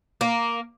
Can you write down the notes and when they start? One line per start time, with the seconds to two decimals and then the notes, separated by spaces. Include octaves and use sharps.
0.21 A#3